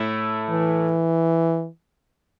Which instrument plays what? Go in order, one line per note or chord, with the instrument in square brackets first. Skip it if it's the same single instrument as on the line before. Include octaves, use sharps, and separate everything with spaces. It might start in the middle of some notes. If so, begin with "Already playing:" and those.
Already playing: [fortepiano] A2 A3 E4 A4
[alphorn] E3